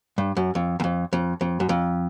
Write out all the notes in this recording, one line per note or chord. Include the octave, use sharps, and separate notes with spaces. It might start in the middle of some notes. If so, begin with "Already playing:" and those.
G2
F#2
F2
E2
F2
F2
F2
F#2
F2